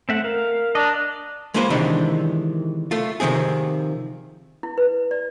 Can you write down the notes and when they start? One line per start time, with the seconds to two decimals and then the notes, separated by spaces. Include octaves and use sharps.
0.09 A3 C4 E5 F#5
0.24 A#4 F5
0.75 D4 D#5 A#5
1.54 G#3 A#3 F4 B4 C5
1.70 C3 D#3 E3 G#3 C4 D4
2.91 A3 F4
3.20 C3 D#3 F3 C4 G#4
4.63 E4
4.78 B4
5.11 D5